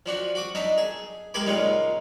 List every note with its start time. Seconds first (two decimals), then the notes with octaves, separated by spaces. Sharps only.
0.06 F3 D4 F#4
0.35 F#4 D6 D#6
0.55 D4 D#4 E5
0.78 G#4
1.34 G#3 A#3 G4 G#5 B5 D6
1.46 A#2 C#3 G#3 D#4